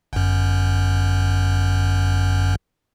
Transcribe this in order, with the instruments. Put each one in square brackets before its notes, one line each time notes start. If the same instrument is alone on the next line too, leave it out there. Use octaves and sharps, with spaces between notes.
[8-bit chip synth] G1 F#2